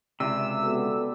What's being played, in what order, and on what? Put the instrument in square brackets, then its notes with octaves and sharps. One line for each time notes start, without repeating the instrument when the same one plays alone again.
[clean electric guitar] C#2 C3 [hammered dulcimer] E4 D5 [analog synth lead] E6
[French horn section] B3 F#4 A4 [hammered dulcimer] G4